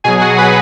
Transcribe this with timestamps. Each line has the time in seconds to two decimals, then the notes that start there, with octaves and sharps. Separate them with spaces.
0.04 B2 F#3 G#4 G#5
0.21 F#4 F#5
0.38 B4 B5